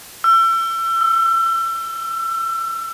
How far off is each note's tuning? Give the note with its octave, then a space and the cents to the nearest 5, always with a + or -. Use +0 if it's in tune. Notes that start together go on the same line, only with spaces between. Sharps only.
E6 +35
E6 -10